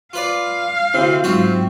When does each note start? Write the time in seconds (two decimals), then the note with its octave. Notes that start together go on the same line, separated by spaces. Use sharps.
0.13 F4 B4 D5 F5
0.94 D2 C3 C4 E4
1.24 G#2 F#3 F4 F#4 E5